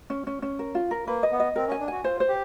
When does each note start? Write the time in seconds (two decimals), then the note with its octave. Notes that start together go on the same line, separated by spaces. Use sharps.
0.10 C#4
0.27 C#4
0.42 C#4
0.59 A#4
0.75 F4
0.91 A#4
1.07 A#3 B4
1.23 D#5
1.31 B3
1.40 D#5
1.56 C4 A#4
1.68 C#4
1.72 G#5
1.80 D4
1.88 F#4 G#5
2.04 F4 C5
2.20 C5
2.28 G4